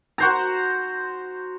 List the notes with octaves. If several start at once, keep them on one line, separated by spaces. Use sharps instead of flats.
F#4 C5 A#5